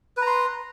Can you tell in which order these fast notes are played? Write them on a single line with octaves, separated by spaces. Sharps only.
B4 A#5 C6